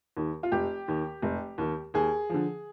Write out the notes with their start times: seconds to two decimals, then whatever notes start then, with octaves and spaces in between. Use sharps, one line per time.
0.17 D#2 D#3
0.43 F4
0.52 F1 G4
0.88 D#2 D#3
1.22 F1
1.58 D#2 D#3
1.94 D#2 G#4
2.29 D3 F3